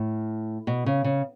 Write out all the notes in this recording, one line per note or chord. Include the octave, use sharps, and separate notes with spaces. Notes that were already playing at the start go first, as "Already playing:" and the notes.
Already playing: A2
B2
C#3
C#3